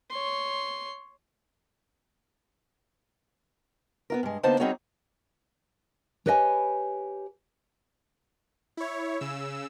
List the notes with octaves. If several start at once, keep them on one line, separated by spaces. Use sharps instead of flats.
C#5 C6
B3 F4 A#4
G2 G#3
D3 A#3 B3 D#4 C5 A5
G3 C4 D#4 F#4 G#4 C#5
G4 B4 C#5 D#5 E5 G#5
E4 C#5
C#3 E6